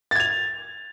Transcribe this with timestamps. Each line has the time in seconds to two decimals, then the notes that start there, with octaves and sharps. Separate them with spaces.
0.11 A6
0.16 G#6
0.20 F7